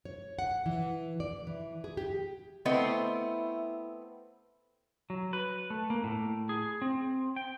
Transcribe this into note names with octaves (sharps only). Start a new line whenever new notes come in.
C#5
F#5
E3
D5
E3
G#4
G4
A3 B3 C4 E4 D#5
F#3
B4
A3
A#3
A2
G#4
C4
G5